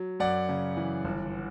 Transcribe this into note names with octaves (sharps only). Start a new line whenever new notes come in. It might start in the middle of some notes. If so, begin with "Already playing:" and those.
Already playing: F#3
F#2 D5 F#5
C#3
E3
G1